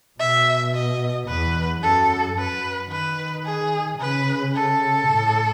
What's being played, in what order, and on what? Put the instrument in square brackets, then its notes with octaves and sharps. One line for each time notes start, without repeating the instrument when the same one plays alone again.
[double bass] B2 [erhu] E5
[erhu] D#5
[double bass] E2 [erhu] B4
[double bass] F#2 [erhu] A4
[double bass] F#2 [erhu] B4
[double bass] D#3 [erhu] B4
[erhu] G#4
[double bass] C#3 [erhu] B4
[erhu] A4
[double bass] A2